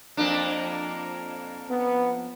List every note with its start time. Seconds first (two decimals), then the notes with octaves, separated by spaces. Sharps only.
0.17 F2 A#3 D4
1.69 B3